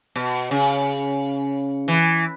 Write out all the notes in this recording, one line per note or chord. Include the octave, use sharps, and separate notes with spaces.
B2
C#3
E3